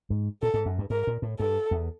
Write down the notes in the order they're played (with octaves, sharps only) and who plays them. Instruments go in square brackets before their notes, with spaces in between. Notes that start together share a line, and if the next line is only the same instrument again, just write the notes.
[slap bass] G#2
[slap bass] A#2 [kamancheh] A4
[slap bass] G#2
F#2
G2
[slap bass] G#2 [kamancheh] A#4
[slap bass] A#2
A2
[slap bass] G2 [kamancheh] A4
[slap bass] E2